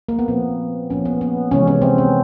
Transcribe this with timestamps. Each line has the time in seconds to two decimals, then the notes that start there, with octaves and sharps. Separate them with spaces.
0.09 A#3
0.19 B3
0.28 A#2 F3 A#3 C4
0.90 A#2 F3 A#3 C#4
1.05 B3
1.21 B3
1.51 C3 E3 G#3 C#4
1.67 C#4
1.82 C4
1.98 B3